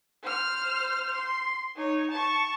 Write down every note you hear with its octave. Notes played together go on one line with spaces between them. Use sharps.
C5 F6
C6
D#4 C#5
A5 C#6